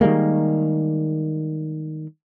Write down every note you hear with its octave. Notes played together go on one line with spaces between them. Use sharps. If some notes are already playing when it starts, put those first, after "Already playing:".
D#3 G3 G#3 A#3